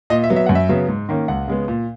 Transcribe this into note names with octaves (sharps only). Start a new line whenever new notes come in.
A#2 D#5
E5
F#3 B3
E5
F#2 F#5
E5
C#3 F#3 B3
G#2
D#3 A#3 C#4
C#2 F#5
C#3 G#3 B3
A#2